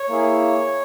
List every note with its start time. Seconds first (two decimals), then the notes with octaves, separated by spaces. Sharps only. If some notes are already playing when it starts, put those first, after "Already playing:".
Already playing: C#5
0.09 A#3 E4 G#4